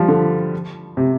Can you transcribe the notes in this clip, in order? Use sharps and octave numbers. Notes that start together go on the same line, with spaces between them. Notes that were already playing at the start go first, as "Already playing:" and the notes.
Already playing: F3 G3
D3
C3